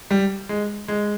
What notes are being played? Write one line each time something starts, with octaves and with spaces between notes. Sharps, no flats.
G3
G#3
G#3